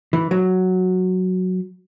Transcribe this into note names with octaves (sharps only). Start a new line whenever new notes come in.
E3
F#3